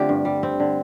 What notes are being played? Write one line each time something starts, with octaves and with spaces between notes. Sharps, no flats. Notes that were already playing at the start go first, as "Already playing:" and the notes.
Already playing: D3 A3 C4 F4 G4
G2
G3
C4
D3